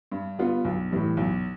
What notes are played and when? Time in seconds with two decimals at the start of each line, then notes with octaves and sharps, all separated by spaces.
0.12 G2
0.39 D3 G3 B3 F4
0.65 B1
0.91 A2 E3 G3
1.17 B1